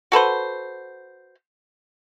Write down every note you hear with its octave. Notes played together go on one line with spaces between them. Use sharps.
F#4 A4 B4 C5